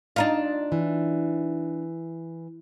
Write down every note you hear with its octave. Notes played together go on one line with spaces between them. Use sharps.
D4 D#4 F4
E3